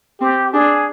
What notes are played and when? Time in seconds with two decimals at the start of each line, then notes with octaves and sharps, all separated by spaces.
0.20 C4 G4
0.53 D4 G#4